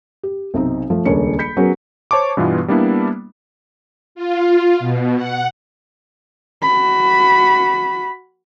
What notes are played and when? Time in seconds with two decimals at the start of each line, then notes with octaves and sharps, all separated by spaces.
0.23 G4
0.54 B1 C3 C4 D#4
0.90 F3 A3
1.05 D#1 C#2 D4 A#4 C#5 C#7
1.38 B5 G6 B6 C#7
1.57 F#3 B3 C#4 G#4 A#4
2.11 C5 C#5 A5 C#6 D6
2.37 G2 B2 E3 B3 F4
2.68 G3 A#3 B3 D4 E4
4.15 F4
4.79 B2
5.16 F#5
6.62 F#4 B5